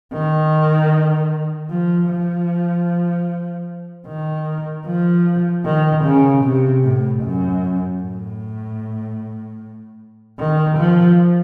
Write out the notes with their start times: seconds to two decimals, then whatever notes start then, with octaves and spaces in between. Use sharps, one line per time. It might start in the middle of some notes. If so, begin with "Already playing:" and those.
0.13 D#3
1.70 F3
2.09 F3
4.07 D#3
4.86 F3
5.65 D#3
6.04 C#3
6.44 C3
6.84 A2
7.23 F#2
8.02 A2
10.39 D#3
10.78 F3